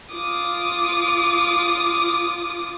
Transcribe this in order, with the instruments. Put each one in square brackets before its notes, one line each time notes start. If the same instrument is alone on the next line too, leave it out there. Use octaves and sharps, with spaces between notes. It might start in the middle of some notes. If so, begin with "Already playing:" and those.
[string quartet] F4 D6 D#6